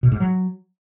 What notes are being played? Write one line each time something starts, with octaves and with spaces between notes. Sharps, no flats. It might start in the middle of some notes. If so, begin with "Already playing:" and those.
B2
G#2
F#3